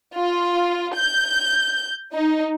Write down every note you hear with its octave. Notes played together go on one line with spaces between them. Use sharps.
F4
G6
D#4